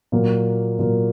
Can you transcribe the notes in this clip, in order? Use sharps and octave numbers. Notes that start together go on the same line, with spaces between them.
A#2 F#3 A#3
A#2 F#3 A#3